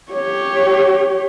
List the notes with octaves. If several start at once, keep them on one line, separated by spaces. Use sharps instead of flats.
G4 C#5